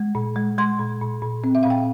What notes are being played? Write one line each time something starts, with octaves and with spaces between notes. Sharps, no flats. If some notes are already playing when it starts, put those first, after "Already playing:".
Already playing: G#3
A#2
G#3
G#3 C6
A#2
A#2
A#2
C4
E5
A#2 F5
G5